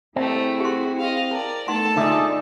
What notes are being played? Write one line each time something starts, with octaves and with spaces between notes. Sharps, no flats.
A3 C4 E4 G4 G#4
F#4 G4 C6
D#5 F5
A#4 D5 A5
A3 B3 D#4 A4 F#5 A5 C6
D3 A3 D#4 F4 G#4 D5 E5